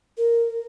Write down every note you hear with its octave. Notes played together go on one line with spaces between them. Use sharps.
A#4